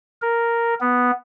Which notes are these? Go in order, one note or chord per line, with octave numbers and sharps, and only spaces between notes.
A#4
B3